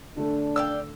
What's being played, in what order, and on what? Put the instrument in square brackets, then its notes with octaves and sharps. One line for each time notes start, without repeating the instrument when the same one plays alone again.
[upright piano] D3 A3 [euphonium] D4
[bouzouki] D5 F5 G5 [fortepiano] E6